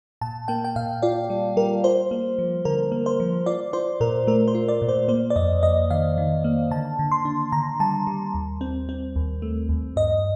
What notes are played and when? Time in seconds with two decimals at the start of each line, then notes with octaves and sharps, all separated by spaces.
0.21 A#2 A5
0.48 A#3 G5
0.65 G5
0.76 A#2 F5
1.02 F4 D5
1.30 G3
1.56 G3 A#4
1.84 F4 C5
2.11 A#3
2.39 F3
2.65 D3 A#4
2.92 A#3
3.06 C5
3.20 F3
3.46 F4 D5
3.73 F4 C5
4.00 A#2 A#4
4.27 A3 A#4
4.48 C5
4.55 F4
4.68 D5
4.82 A#2
4.89 C5
5.08 A#3 C5
5.30 D5
5.36 F2 D#5
5.63 F2 D#5
5.90 D#3 F5
6.18 D#3
6.44 A#3
6.71 D3 A5
6.99 D3
7.12 C6
7.25 D4
7.52 D3 A#5
7.80 G3 A5
8.07 G3
8.34 D#2
8.61 C4
8.89 C4
9.16 D#2
9.42 A3
9.69 D#2
9.96 G2 D#5